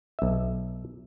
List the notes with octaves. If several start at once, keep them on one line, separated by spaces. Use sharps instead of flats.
B1 E5